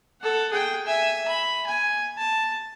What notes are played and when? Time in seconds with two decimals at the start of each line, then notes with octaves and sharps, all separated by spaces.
0.21 A4 F#5
0.52 G#4 G5
0.86 E5 G#5
1.28 B5
1.66 G#5
2.17 A5